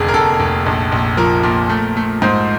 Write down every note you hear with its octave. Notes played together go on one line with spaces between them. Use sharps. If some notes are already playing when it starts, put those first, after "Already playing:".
Already playing: F1 D#2 D3 G#4
A#4
F1 A4
F1
A#1
A#1
F3 A#4
A#2
A3
A3
G#2 C5